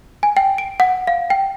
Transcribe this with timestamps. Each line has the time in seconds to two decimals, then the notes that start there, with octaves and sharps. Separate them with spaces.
0.23 G#5
0.37 G5
0.58 D7
0.80 F#5
1.07 F5
1.30 G5